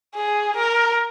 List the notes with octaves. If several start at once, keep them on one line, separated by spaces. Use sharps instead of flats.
G#4
A#4